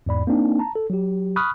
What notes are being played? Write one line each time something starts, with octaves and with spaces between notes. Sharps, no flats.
E2 G#2 D5 B5
A#3 C4 D4 D#4
A5 A#5
A4
F#3 G4
B5 C#6 D#6 F6 F#6